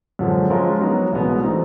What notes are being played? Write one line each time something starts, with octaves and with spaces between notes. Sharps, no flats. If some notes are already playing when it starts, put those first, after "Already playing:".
F#2 D3 F3 G#3
F3 G#3 C#4 F4 A#4
F#3 B3 D#4
C2 B2 G#3 B3
E3 A3 C4 D#4